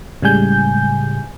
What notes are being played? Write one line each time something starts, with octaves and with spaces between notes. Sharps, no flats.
A2 C#3 G3 G#3 G#5 G6